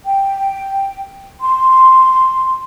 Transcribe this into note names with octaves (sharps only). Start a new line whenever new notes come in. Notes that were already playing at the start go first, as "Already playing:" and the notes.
G5
C6